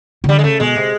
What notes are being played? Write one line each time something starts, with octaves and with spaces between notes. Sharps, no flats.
C#3
D3 G3
G#3
C#3 A3
B2 G#3
C3